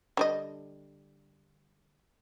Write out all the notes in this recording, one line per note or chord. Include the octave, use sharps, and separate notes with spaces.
D3 G3 D#5